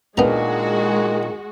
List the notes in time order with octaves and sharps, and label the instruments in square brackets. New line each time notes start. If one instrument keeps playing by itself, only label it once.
[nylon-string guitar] A#2 D4 [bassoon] D#3 [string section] G#3 F#4 [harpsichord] B3 A#5